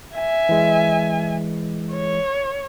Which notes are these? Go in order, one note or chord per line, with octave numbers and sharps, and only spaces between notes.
E5 G#5
E3 G#3
C#5